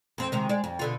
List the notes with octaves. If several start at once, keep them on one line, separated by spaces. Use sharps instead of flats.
F2 C4
C3 D#3 G#3
G#3 D5
F2
B2 D3 F4